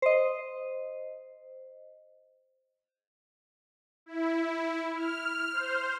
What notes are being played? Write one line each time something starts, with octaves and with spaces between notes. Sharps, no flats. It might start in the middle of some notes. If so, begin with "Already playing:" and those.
C5 D#5
E4
F6
C5